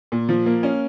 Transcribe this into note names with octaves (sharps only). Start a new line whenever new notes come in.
A#2
F3
A#3
C#4